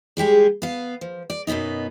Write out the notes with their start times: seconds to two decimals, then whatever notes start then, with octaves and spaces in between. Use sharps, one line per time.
0.17 G3 G#3 G4 G#4
0.62 B3 F5
1.01 F3
1.30 D5
1.47 F#2 B2 D#3 B3 D#4